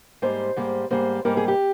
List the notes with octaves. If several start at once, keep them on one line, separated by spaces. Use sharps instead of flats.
G#2 G3 A#3 C5
G#2 G3 A#3
G#2 G3 A#3 C5
G#2 G3 A#3 A#4
G#4
G4